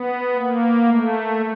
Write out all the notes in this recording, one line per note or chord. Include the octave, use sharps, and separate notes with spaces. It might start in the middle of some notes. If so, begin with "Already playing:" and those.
Already playing: B3
A#3
A3